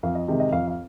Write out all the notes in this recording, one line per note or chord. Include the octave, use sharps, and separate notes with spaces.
F2 F5
D#5
C3 D#3 G#3
D#5
F2 F5
F5